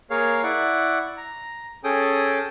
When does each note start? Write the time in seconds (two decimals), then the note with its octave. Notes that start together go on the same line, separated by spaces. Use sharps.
0.10 A#3 G#4 A#4 C#5 F5
0.43 E4 D5 F#5 C#6
1.17 A#5
1.84 C#4 G#4 A4 G5 D#6